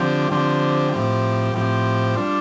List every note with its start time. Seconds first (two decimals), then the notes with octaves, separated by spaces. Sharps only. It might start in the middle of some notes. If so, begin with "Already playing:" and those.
Already playing: D3 F3 C4 G4
0.32 D3 F3 C4 G4
0.93 A2 F3 C4 G4
1.54 A2 F3 C4 G4
2.16 G3 D4 F4